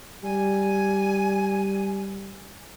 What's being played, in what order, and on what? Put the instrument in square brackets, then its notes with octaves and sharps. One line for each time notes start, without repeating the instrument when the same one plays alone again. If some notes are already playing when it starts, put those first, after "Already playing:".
[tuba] G3 [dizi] G#5